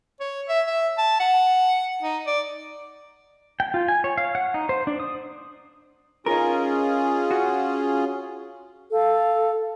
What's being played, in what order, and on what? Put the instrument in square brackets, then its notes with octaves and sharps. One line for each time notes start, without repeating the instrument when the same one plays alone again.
[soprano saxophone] C#5
E5
E5
A5
F#5
D#4
D5
[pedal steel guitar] G5
F4
G#5
C#5
F5
F#5
D#4
C5
D4
D#6
[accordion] C#4 F4 G#4 [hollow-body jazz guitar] D#4 A#4
[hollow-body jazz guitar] F#4
[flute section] A4 F5